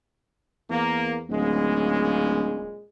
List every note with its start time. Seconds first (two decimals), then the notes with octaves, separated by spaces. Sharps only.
0.70 E2 A#3
1.29 D1 A#2 C#3 G#3